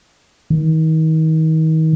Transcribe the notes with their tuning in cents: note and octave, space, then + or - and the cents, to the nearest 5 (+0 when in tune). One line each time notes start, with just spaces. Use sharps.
D#3 +35